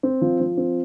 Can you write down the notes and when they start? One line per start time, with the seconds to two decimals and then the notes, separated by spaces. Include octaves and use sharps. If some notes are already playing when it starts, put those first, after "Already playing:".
0.03 C4
0.21 F3
0.40 F3
0.57 C4